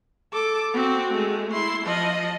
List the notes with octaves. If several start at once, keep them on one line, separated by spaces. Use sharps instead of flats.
A4 D6
C4 F#4
G#3 A3
E4 C6
F3 D#5